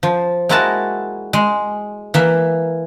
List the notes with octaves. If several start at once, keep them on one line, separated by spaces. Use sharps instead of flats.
F3
G#3 A#3 E4 F#4 A#4 A5
G#3
E3 A#3 E5